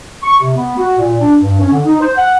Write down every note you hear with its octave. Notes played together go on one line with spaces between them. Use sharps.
C#6
C3
B3
F#4
A#2
D4
G2
C#4
D3
D#4
C5
F#5